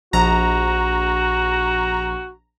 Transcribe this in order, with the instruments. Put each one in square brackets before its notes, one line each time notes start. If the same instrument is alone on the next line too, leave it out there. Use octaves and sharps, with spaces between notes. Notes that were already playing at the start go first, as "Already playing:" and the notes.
[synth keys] A#1 [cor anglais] F#4 [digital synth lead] A#5